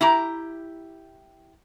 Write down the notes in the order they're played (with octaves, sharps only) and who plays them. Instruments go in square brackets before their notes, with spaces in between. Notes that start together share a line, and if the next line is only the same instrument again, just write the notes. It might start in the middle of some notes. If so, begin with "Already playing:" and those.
[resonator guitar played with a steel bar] E4 G4 A#5